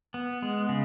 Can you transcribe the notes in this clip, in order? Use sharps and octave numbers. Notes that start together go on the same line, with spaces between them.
B3
G#3
C#3